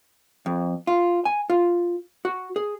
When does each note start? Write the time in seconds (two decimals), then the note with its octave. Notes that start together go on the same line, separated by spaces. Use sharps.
0.46 F2
0.87 F4
1.25 G#5
1.50 F4
2.25 F#4
2.56 G#4